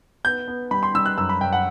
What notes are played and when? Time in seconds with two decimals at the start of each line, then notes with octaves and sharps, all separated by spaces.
0.24 B3 G6
0.48 B3
0.71 G3 B5
0.83 C6
0.95 G3 E6
1.06 F#6
1.17 F#2 E6
1.29 B5
1.41 F#2 G5
1.53 F#5